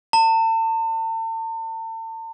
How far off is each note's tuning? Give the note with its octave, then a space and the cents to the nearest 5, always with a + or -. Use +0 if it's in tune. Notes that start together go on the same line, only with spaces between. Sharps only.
A5 +40